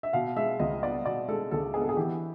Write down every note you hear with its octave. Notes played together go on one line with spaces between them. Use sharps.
E5
B2 F5
G#3 E5
C#2 D#5
B3 D5
B2 D5
G#3 A4
C#2 A4
B3 G#4
A4
G#4
E3 G4